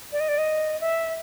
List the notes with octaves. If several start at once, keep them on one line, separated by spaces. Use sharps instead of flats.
D5
D#5
D5
D#5
E5